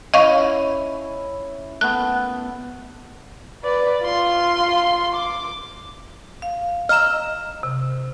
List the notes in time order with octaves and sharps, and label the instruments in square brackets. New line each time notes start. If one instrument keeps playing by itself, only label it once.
[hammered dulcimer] C#4 E4 [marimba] D#5 F5 C#6
[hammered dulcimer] A3 B3 [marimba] F#6
[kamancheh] B4 D5
F4 C6
D6
[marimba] F5
[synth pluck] D#5 A#5 E6 [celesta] F6 E7
[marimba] C3